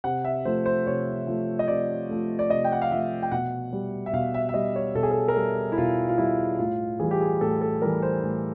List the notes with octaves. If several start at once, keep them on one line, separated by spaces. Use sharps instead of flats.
C3 F#5
E5
F3 A3 C5
C5
C3 C#5
F3 A3
D#5
C3 D5
F3 A3
D5
C3 D#5
G5
F#5
F5
F3 A3 E5
G5
B2 F#5
G3
E5
B2 F5
E5
E5
G3 D#5
C#5
B2 A4
G#4
A4
A#4
G3 A4
E4
B2 F4
F4
G3 E4
A2 F4
E3 G3 G#4
G4
G#4
A2 A4
A4
E3 G3 A#4
C5
A2